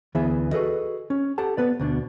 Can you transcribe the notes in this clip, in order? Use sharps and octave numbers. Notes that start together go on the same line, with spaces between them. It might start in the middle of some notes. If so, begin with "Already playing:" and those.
D2 E3 B3 G#4 E5
F#4 G#4 A4 B4 D#5
C#4
G4 A4 F#5 A5
B3 B4 D5
D2 B2 D4